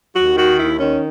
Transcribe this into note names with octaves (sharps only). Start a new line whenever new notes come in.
D#2 F#4
D#3 F#4
D#2 E4
D#3 C#4